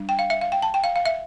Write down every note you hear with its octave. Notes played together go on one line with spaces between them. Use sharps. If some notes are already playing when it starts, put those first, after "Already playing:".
Already playing: G3 D4
G5
F5
E5
F5
G5
A5
G5
F5
F5
E5